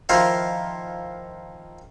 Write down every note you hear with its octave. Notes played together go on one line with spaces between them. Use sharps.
D#3 F3 E4 F4 A#4 C5